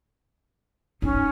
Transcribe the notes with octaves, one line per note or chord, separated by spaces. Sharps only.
C#4 D#4